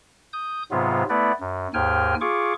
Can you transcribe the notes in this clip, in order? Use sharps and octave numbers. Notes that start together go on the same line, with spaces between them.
D#6 G6
G#2 C3 F#3 B3 F4
A3 B3 E4 B4 D5
F#2
D#2 G#2 G5 G#5 F6
F4 G#4 C#6 D6